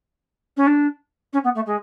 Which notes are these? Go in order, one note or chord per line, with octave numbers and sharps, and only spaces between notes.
C#4
D4
C#4
B3
A3
G#3